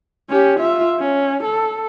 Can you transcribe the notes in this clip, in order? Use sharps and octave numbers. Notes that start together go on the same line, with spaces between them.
C#4 G4
F4 E5
C#4
A4